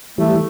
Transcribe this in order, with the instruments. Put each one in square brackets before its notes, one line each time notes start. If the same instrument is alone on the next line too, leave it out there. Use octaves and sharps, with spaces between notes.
[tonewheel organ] E3 G3 [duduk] A3